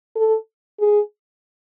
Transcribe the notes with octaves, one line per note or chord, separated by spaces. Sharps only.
A4
G#4